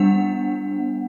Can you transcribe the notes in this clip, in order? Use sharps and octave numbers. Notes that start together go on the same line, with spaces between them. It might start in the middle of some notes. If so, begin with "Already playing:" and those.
Already playing: G3 B3 D4 F#5